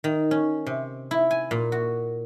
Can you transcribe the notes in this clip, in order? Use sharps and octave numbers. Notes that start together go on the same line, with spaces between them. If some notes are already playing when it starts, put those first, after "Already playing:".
D#3
C#4
C3
E4
G#5
A#2
F#4